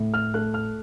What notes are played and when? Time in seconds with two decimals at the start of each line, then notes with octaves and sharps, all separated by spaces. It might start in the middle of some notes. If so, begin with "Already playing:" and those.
Already playing: A2
0.14 F6
0.34 A3 F#6
0.54 F6